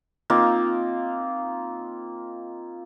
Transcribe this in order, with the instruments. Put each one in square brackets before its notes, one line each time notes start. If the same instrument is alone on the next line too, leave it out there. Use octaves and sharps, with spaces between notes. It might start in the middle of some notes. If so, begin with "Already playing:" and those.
[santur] A#3 C4 D#4 F4